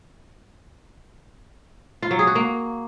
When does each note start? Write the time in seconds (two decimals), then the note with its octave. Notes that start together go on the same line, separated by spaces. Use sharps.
2.03 F4
2.11 F#3
2.19 G#4
2.27 F#4
2.35 A#3